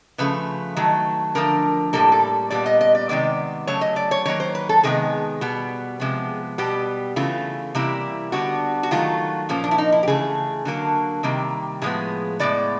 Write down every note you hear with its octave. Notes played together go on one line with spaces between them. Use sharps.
C#3 F3 A3 B4
D#3 F#3 A3
D3 F3 A3 A#4
A2 E3 G3 A#3 A4
A4
A#2 G3 B3 D5
D#5
D#5
D5
C3 D#3 G#3 B3 D5
C#3 F#3 A3 C#5
D#5
D5
C#5
D#3 F#3 A#3 C#5
C5
B4
A4
C3 D#3 G#3 B3 G#4
B2 G3 B3
C3 F3 G#3 B3
B2 G3 B3 G4
C#3 E3 A3 F4
C3 E3 G3 A#3 E4
D3 G3 B3 F#4
F#4
D#3 F#3 A3 F4
A#2 F3 A#3 C#4
D4
E4
D#4
E4
G4
C#3 E3 A3 G#4
D3 F#3 A#3
C3 D#3 G3 A#3
A2 F3 G#3 B3 G#4
A2 F3 G#3 B3 D5